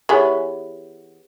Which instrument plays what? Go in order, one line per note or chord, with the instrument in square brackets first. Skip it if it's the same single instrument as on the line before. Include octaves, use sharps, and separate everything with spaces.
[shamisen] E3 B3 [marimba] G4 G#4 [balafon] C#5 C#6